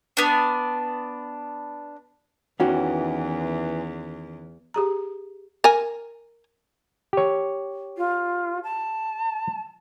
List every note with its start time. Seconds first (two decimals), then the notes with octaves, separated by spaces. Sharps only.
0.17 B3 D4
2.60 E2 D#3 E3 C#4 F#4 G4
4.74 G4 G#4 A#5
5.64 A#4 G#5
7.13 G4 C#5
7.97 F4
8.63 A5